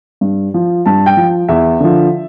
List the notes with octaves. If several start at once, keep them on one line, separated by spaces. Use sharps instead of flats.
G2
F3
G2 A5
G5
F3
E2 E5
D3 F3